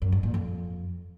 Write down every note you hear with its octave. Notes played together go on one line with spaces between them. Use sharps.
F#2
G2
A#2
F2